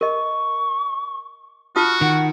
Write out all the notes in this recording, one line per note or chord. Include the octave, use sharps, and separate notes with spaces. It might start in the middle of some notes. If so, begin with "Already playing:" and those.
A#4 D#5 C#6
F4 F#4 A5 D#6 F6
D#3 F#5